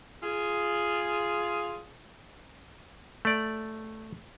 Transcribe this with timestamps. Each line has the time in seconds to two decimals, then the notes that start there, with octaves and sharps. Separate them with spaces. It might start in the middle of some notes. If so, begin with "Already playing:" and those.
0.23 F4 G#4
3.25 A3 D5